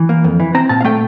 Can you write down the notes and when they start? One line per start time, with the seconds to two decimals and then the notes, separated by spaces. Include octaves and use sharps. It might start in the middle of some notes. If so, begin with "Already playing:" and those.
Already playing: E3
0.09 A#3
0.24 F2
0.40 E3
0.55 C4 A#5
0.69 A#2 A5
0.81 F5
0.84 A3 G5